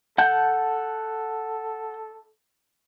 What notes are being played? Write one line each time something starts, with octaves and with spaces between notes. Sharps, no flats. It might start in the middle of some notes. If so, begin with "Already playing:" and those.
A4 F#5 A5 G6